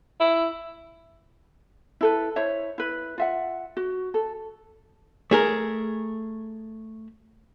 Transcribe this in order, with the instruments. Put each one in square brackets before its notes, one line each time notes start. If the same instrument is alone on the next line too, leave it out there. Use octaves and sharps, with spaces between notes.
[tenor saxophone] E4
[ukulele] E4 A4 B4
E4 C5 C#5 E5
E4 B4
F4 E5 F#5
F#4
A4
[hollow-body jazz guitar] A3 G#4 A#4